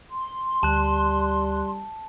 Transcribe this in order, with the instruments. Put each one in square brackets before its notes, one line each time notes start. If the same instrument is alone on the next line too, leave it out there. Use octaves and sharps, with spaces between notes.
[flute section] C6
[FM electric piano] D2 F#6 [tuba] G3 [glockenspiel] A5